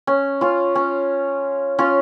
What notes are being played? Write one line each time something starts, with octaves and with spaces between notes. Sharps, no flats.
C#4
C#4 F4
C#4
C#4 F4